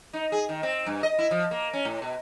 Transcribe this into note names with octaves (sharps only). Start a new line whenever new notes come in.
D#4
G#4
D#3
C4
G2
D#5
E4
F3
A#3
C#4
A2
B2